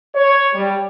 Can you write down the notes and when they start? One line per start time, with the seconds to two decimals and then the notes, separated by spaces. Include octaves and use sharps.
0.15 C#5
0.55 G3